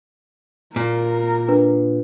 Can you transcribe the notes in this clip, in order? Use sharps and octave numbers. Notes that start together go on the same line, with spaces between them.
A#2 A#4
D4 B4